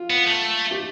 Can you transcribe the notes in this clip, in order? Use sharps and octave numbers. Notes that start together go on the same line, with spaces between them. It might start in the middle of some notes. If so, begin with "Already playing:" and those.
Already playing: F4
B3
A3
G4